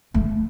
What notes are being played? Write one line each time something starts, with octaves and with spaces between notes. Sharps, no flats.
A3